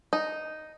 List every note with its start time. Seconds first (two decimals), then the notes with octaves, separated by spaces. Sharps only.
0.13 D#4